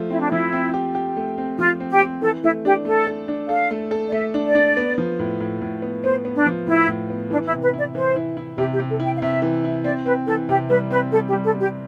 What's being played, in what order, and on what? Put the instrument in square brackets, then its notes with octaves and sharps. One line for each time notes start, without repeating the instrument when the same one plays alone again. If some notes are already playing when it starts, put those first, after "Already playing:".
Already playing: [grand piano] F3 A3
[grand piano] C4 [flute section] E4
[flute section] D4
[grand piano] F3 [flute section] E4
[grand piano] C4
G4
G4
A3
C4
[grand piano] F3 [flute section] F4
[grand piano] C4
[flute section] G4
[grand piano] C4
[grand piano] E3 [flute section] A4
[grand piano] A3 [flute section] E4
[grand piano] D4 [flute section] G4
[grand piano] A3 [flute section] A4
[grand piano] A4
D4
[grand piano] A4 [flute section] F5
[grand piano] A3
A4
[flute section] D5
[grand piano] A3 [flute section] E5
[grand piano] D4
[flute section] D5
[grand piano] D4
B3
F3
A2
A2
A2
B3
[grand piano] B3 [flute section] C5
[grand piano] B3
[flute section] D4
[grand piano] F3
[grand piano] A2 [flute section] E4
[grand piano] A2
B3
[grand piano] E3 [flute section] D4
[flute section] E4
[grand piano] C3
[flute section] B4
[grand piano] E4 [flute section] D5
[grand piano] E3 [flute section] C5
[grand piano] E4
E4
[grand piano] C3 [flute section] G4
[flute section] G4
[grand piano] C3
[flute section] A4
[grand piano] E4
[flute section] G5
F5
[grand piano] C3 [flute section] E5
[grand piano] E3
E4
[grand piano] C4 [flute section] D5
[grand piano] C4 [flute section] B4
[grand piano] E3 [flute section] A4
[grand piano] C3 [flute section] G4
[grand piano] G3 [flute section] B4
[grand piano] C4 [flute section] B4
[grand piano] G3 [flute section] A4
[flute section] G4
[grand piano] G3
[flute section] A4
[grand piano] G3
[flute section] G4